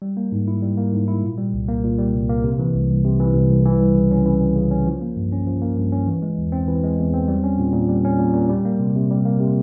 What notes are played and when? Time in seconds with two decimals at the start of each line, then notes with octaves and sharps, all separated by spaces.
0.02 G3
0.17 A#3
0.32 G#2
0.48 E4
0.62 G3
0.78 A#3
0.93 G#2
1.08 E4
1.23 A#2
1.38 G3
1.54 C2
1.68 A#3
1.84 A#2
1.98 G3
2.13 C2
2.29 A#3
2.44 C3
2.59 E3
2.74 C2
2.90 C2
3.05 C3
3.20 E3
3.35 C2
3.50 C2
3.66 E3
3.80 G3
3.95 C#3
4.11 C#4
4.26 E3
4.41 G3
4.56 C#3
4.71 C#4
4.86 F3
5.02 A#3
5.17 G2
5.32 C#4
5.47 F3
5.62 A#3
5.77 G2
5.92 C#4
6.07 E3
6.22 G#3
6.38 E2
6.52 C4
6.68 E3
6.83 G#3
6.99 E2
7.14 C4
7.28 G3
7.44 C#4
7.58 A#2
7.73 A#2
7.89 G3
8.05 C#4
8.19 A#2
8.34 A#2
8.49 G3
8.65 A#3
8.80 C3
8.96 C3
9.11 G3
9.25 A#3
9.40 C3